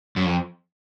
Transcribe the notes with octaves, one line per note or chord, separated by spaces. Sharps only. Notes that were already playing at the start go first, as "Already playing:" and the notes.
F#2
F2